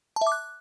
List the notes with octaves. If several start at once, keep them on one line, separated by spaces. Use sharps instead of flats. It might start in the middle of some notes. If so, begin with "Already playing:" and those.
A5
E5
D6
F#6